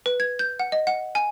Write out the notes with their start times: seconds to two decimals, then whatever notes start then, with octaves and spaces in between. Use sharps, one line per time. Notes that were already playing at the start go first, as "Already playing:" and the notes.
0.06 B4
0.20 G#6
0.39 G6
0.59 F#5
0.72 D#5
0.87 F#5
1.15 G#5